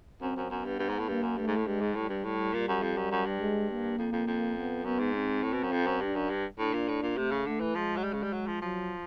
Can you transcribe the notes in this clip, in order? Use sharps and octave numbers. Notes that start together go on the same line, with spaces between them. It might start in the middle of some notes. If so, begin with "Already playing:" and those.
F#2 C4
F#2
F#2 B3
G2
G2
G#2
A2
G2 A#3
F#2
G2 A3
G#2
A2
G2 G#3
G#2
A2 G3
G2
A2 G3
A#2 G3
F#2
F2
F#2
F#2
G2
G#3
A#3
F2
F2
F2
B3
F#2 B3
G#2
C4
A2
B2
F#2
F2
F#2
G2 D4
F#2
G2
A2 D4
A#2
A2
A#2
C3 A3
C#3
D3 A3
E3
F3 G#3
F#3
G3
C#3
G3
F#3
F3
F3 F#3